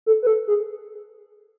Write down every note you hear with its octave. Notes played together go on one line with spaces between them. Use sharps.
A4
B4
A4
G#4